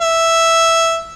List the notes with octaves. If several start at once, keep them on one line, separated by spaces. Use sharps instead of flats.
E5